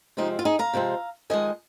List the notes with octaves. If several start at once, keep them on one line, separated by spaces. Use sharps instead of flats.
C3 F3 G#3 C4 D#4
F4
D#4 G#4
F5 A#5
C3 F3 G#3 C4
F2 D#3 G#3 D#5 G#5